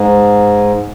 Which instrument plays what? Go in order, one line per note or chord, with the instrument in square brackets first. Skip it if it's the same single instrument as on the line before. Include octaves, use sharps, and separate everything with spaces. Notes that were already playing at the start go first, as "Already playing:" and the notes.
Already playing: [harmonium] G#2